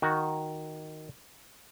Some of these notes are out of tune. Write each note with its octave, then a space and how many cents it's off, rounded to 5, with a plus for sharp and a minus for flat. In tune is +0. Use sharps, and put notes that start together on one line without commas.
D#3 +0 F#4 +0